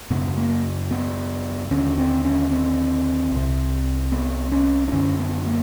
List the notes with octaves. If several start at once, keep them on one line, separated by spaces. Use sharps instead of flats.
F#2 C#3 B3
A#3
B3
D#2 D3 C#4
C4
C#4
C4
C2 C3
B3
C#4
D4
F#2 D3 C#4
B3
A#3